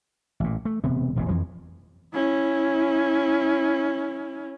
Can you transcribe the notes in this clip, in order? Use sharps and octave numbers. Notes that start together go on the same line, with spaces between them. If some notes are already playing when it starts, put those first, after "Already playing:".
A1 A#2
A3
E1 C3 B3
E1 A1 F2 B2
F2 E3 F3
C#4 E4